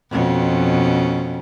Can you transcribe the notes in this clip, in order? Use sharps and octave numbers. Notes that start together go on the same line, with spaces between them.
F2 B2 C#4